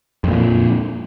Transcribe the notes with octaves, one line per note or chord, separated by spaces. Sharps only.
F2 A#2 F3